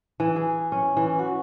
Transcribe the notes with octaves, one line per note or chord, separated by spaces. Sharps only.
E3
G#4
C#4
E3
F#4